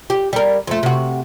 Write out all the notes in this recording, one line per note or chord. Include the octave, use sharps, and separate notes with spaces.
G4
G3 A#4
F2 A3
C3 F#4